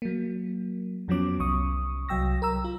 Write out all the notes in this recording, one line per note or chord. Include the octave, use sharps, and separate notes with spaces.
F#3 A#3
F2 F3 F#3 B3 C#4 D6
C2 C#6 D#6
C2 F#3 G5 E6 A#6
A#4 A#5 E6
F4